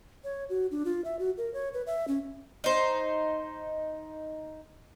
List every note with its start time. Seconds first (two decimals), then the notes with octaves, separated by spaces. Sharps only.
0.24 C#5
0.50 F#4
0.71 D4
0.85 F4
1.05 E5
1.19 F#4
1.37 A#4
1.54 C#5
1.74 B4
1.87 E5
2.08 C#4
2.64 D#4 C5